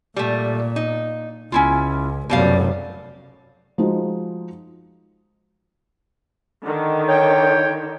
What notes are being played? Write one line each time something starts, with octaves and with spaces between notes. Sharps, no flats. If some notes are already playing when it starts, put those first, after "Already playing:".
A#2 G3 A3
D#4
C#2 C#4 E4 F4
F1 F#2 B2 G3 F5
F3 G#3 D#4 F#4
D3 D#3
C#5 G5